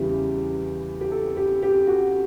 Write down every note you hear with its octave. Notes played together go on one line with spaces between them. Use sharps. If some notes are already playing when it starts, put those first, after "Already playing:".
Already playing: E2 C#3 E3 G3 G4
G4
A4
G4
G4
F#4